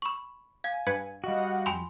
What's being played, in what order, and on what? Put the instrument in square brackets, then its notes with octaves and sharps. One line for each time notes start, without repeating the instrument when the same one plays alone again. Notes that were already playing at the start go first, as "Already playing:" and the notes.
[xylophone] B5 C#6
[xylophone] F5 [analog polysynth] G#5 [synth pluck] G#6
[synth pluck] G2 B4 C#7 [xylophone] G#6
[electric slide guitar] G3 F#4 [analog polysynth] D#5 F5 F#5
[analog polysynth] F2 [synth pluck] G5 [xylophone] G#5 B5 C6